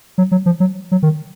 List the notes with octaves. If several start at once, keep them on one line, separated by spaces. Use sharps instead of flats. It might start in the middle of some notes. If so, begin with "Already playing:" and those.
F#3
F#3
F3
F#3
F#3
D#3